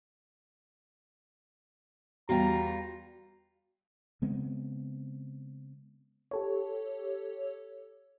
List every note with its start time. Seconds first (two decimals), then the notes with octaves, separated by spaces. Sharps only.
2.29 E2 G3 F4 F#4 G5 A#5
4.22 C#3 G#3 B3 C4
6.31 G4 A4 C#5